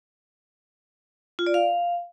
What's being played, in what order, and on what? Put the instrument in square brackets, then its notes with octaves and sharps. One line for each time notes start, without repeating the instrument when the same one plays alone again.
[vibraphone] F4
D5
F5